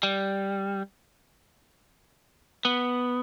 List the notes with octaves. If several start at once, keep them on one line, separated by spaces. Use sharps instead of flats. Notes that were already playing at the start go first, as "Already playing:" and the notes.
G3
B3